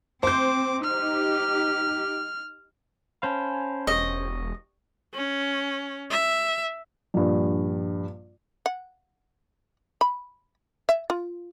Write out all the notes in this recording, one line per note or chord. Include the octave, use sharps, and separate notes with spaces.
C4 C5 D6 G6
D#4 G4 F6
C#4 C5 F5 G#5 A5 B5
E1 G4 D#5 C#6
C#4
E5
A#1 G2
F#5
B5
E5
F4